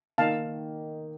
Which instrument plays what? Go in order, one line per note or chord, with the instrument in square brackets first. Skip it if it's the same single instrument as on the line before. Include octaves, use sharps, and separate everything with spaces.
[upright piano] D#3 A#3 D#4 [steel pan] F5 A5